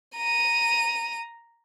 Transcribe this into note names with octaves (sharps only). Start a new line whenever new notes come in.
A#5 D#7